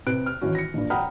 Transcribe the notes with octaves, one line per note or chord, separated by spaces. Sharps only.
C3 B4 F#6 D7
F6
D#3 E3 C#4 F#4
A#6 C#7
A#1 G2
F#5 G5 A#5 B5 D#6 F6